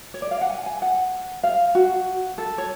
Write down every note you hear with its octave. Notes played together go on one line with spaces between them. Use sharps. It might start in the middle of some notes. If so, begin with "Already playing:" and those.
C#5
D5
F5
F#5
G#5
G#5
F#5
F5
F#4
A4
C#5